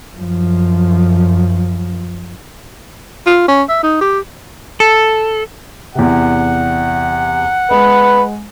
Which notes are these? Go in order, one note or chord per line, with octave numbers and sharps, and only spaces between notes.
F#2 F3
F4
C#4
E5
D#4
G4
A4
E2 C3 F#5
G#3 B4